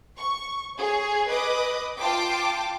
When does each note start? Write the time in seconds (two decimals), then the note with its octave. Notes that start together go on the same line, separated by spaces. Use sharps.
0.18 C#6
0.78 G#4 C#5
1.30 B4 D#5 D6 D#6
2.00 F4 G5 A5 C6 D6